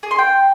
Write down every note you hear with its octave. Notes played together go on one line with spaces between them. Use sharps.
G#4
C6
G5